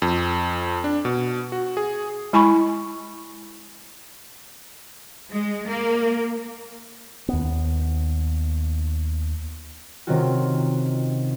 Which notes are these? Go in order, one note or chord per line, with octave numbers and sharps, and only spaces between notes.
F2
D4
B2
F#4
G#4
G#3 E4 G#5 B5 C#6
G#3
A#3
D#2 B3
C3 D#3 C4 C#4 F4 F#4